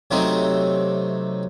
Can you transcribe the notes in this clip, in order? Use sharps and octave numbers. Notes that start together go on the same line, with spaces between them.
C3 F#3 A3 C4 D#4